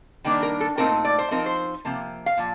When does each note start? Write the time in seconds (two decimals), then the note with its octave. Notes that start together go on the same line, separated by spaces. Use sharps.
0.24 D#3 G3 A#3 D4
0.43 A#4
0.60 A4
0.77 A#2 A3 C4 D#4 A#4
1.05 D5
1.18 C5
1.31 F3 C4 D#4 A#4
1.46 C5
1.85 C3 F3 A#3
2.26 F5
2.37 A#2 F3